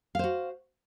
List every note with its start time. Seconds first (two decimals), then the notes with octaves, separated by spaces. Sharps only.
0.15 F5
0.19 C5
0.24 F#4